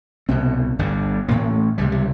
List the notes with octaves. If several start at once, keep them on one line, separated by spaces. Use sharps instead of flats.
C2 B2 C4
G1 G2 D3
A1 A2 A#3
C#2 C3 G3
G3